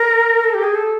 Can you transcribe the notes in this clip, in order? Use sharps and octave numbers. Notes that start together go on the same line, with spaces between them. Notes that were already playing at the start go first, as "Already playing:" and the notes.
Already playing: A#4
A4
G4
G#4
A4